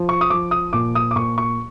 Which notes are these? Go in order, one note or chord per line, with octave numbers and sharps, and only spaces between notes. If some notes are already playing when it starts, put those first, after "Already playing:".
Already playing: F3
C#6
D#6
F3 D6
D#6
A#2 D6
D#6
D6
A#2 C#6
C#6